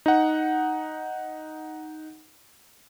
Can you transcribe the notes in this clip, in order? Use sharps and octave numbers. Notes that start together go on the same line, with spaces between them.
D#4 F#5